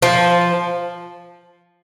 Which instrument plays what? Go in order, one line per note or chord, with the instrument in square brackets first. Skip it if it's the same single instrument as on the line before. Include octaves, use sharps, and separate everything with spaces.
[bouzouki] F3